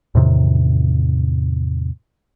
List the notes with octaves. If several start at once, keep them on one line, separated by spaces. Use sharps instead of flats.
E2 A2 C3 D#3